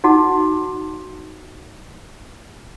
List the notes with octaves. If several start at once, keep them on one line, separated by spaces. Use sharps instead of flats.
D#4 F#4 F#5 A5 D6